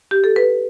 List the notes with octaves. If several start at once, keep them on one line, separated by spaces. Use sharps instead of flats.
G4
A4
B4